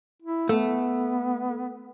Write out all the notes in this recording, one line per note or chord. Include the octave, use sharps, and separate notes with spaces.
E4
A3 B3